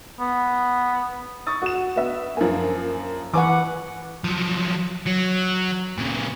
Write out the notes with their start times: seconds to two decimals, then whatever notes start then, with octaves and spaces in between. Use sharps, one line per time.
0.20 B3
1.47 C#6 D#6 A6
1.62 F#4 E7
1.96 B3 E5
2.37 F#2 F3 A#3 G#5
3.34 E3 B4 F#5 G#5 C#6 D6
4.24 F3 F#3
5.07 F#3
5.98 A#2 C#3